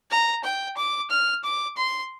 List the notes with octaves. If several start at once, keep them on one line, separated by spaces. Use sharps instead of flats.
A#5
G5
D6
F6
D6
C6